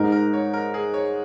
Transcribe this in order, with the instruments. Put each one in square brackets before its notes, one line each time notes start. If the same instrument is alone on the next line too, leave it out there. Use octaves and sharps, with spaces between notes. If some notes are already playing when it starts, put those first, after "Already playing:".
Already playing: [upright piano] G#2 G#3 D#4 G#4 [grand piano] A#4
[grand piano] A#4
C#5
A#4
G#4
C#5